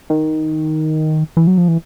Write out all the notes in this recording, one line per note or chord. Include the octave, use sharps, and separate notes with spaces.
D#3
E3
F#3
F3
E3